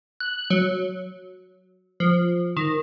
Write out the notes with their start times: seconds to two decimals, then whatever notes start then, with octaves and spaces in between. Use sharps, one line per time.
0.20 F#6
0.50 F#3
2.00 F3
2.57 D#3